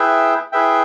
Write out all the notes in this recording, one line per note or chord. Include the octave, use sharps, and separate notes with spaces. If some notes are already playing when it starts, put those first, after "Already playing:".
Already playing: E4 G#4 B4 E5 G5
E4 G#4 B4 E5 G5